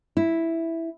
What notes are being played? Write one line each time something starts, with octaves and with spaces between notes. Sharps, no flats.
E4